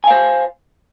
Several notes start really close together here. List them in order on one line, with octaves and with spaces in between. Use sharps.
G#5 F5 C5